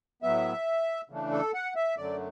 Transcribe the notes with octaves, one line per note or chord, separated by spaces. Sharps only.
A2 F#3 B3 E5
C#3 E3 A3 D4
A4
F#5
E5
F#2 D3 F#3 A3 D5